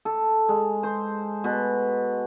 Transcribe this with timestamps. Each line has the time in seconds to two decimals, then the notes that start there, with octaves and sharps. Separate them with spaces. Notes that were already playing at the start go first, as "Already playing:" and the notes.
0.05 A4
0.49 G#3
0.83 C5
1.44 B2